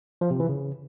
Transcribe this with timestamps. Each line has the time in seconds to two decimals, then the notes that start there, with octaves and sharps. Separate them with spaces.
0.21 F3
0.31 C3
0.40 E3
0.49 C#3